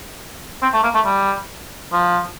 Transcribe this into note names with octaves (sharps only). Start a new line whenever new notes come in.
C4
A3
A#3
A3
G3
F3